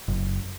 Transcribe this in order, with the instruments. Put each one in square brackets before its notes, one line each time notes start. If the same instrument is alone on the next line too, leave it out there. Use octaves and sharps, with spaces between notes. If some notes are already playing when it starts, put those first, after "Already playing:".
[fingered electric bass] F#1